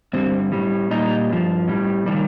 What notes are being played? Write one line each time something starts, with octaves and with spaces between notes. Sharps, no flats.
G2 D3 G3 C4
A2 G3
A#2 G3 D#4
G2 F3
A2 G3
C3 D#3 G3